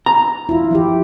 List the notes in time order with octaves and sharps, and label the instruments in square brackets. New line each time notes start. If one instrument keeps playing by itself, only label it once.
[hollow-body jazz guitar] A#5
[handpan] E4 F4
F3 E4 G4